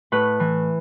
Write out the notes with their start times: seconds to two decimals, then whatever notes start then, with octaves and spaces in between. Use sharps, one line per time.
0.12 A2 B4
0.40 E3